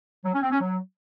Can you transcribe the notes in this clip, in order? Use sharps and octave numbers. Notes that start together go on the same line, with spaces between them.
F#3
C#4
C4
C#4
F#3